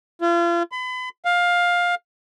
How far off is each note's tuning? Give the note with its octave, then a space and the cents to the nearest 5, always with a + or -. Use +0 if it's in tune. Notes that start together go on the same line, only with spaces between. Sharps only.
F4 -35
B5 +35
F5 +15